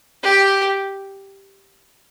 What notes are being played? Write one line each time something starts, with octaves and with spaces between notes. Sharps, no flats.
G4